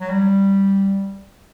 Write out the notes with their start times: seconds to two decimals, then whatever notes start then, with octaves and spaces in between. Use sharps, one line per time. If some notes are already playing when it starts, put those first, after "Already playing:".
0.01 F#3
0.10 G3